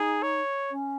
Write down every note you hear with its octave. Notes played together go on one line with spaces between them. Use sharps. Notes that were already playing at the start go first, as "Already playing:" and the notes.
Already playing: D#4 G#4
C#5
C#4